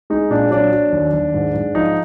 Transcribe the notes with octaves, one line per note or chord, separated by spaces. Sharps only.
G#3 D#4
A#2 D4
F#3 D4
F#3
D#2
D#2
G#2
G#2
F3 D#4